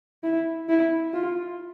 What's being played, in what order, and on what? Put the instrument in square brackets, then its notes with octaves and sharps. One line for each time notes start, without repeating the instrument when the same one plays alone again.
[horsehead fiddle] E4
E4
F4